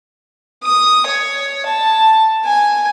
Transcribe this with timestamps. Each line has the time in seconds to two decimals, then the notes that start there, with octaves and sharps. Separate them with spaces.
0.63 D#6
1.06 C#5
1.66 A5
2.45 G#5